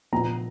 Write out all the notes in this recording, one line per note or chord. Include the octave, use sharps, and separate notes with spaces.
A#2 F3 A#5